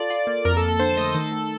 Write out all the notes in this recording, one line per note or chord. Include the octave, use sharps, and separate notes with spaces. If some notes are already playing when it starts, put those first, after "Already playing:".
Already playing: F4 A4 D5
F4
A#3
F2 A#4
A4
F2
A4
D3 C5
A3 D#5
D#3 A4
D#3